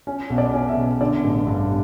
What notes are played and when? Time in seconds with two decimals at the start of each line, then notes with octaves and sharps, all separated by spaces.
0.07 C#4
0.30 B1
0.38 D5
0.54 C#4
0.69 E5
0.77 B2
1.01 D3 D5
1.24 A1
1.47 G2